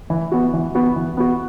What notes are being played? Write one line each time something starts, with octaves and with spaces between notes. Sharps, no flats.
E3
B3 F#4
E3
B3 F#4
E3
B3 F#4